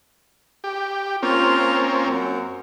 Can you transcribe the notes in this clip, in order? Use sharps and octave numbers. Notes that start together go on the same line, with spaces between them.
G4
A#3 C4 C#4 F4
F#2